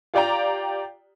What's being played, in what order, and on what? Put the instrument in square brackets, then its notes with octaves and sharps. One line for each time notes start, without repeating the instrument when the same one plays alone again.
[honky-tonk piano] F4 G4 D5 G5 A#5